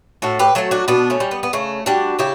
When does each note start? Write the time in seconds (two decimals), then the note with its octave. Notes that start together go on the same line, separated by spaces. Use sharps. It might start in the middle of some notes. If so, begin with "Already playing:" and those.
0.22 A2 F#4 A4
0.39 G4 B4
0.55 F#3 A3 F#4 A4
0.71 D4 F#4
0.88 B2 B3 D4
1.10 A3 C#4
1.20 G3
1.31 B3
1.43 B3
1.53 C#3 A3
1.86 G3 D4 F#4
2.19 C#3 E4 G4